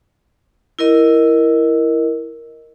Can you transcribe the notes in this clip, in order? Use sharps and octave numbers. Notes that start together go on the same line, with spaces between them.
E4 A#4 D#5